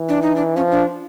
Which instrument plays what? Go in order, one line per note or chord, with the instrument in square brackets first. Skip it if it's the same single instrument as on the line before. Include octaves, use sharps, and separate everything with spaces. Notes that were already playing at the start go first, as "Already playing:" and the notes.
Already playing: [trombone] E3
[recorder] D4
D#4
D4
[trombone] F3 [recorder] C#4
[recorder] D4